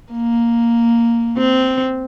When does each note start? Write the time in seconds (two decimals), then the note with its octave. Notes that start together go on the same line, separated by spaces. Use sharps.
0.12 A#3
1.37 C4